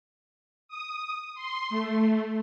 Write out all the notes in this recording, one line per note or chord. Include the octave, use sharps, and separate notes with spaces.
D#6
C6
A3